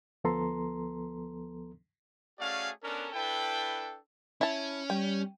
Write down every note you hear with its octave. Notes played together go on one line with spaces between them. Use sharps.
D2 F3 B3 A4 A#5 C6
A3 C#4 F#4 G#4 D5 F5
B3 C#4 D4 A4 A#4
D4 E4 A4 B4 G5
C#4 E4 A5
G3 G5